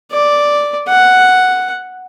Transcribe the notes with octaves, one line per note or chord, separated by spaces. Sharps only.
D5
F#5